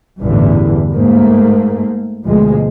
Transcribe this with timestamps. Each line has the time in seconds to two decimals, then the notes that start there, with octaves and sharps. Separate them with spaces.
0.22 A1 E2 G2 D3 E3
0.93 G#2 A3 A#3
2.26 D2 B2 F3 G#3